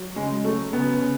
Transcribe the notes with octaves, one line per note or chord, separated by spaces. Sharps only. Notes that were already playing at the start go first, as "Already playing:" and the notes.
Already playing: F#3
C#3 G#3
F#3 A3
C#3 B3
C#3